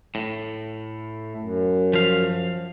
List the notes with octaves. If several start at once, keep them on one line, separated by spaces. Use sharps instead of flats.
A2
F#2
F3 F5